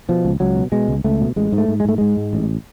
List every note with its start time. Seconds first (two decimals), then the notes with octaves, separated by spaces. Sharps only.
0.09 B2 F3
0.25 C#2
0.40 C#2 F#3
0.56 B2
0.72 B2 G#3
0.88 C#2
1.04 C#2 A3
1.21 B2
1.36 A1 G#3
1.52 G#2
1.58 A3
1.68 G#2
1.80 G#3
1.85 G#2 A3
1.98 G#2 G#3
2.17 G#2
2.33 A1